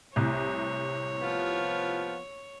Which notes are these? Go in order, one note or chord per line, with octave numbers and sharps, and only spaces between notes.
C2 A2 C3 C#5
F3 B3 F4